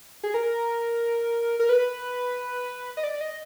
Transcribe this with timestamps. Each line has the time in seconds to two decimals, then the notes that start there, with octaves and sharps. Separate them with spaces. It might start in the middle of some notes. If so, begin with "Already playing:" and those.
0.23 G#4
0.34 A#4
1.59 A#4
1.69 B4
2.97 D#5
3.04 D5
3.21 D#5